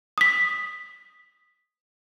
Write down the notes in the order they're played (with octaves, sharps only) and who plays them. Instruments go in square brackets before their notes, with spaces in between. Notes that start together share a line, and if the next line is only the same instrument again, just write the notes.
[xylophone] D#6 B6